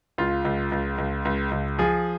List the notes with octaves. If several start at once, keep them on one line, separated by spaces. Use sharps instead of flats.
C#2 F4
C#2
C#2
C#2
C#2
C#2
F3 G#4